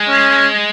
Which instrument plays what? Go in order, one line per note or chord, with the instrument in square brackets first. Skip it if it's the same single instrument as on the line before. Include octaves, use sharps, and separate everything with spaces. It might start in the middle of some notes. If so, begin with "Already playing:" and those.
Already playing: [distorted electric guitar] G#3
[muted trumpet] C#4